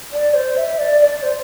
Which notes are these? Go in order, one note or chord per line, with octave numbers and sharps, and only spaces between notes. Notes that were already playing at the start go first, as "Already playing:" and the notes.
D5
C5
E5
D5
D5
C5